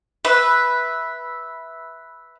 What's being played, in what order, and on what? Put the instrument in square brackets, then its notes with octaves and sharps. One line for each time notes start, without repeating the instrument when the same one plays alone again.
[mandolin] B4 E5